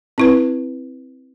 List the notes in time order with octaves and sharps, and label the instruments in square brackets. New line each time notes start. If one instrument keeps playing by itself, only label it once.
[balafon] C4 E4 B4